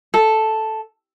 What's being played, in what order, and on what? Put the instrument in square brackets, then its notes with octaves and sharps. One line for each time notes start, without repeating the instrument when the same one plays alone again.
[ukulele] A4